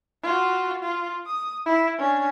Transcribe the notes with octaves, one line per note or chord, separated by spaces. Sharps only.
F4 F#4
F4
D#6
E4
C#4 D4